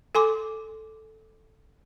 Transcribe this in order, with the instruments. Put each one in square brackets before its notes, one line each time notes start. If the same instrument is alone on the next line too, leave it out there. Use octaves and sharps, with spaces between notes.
[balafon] A4 G#5 C6 D6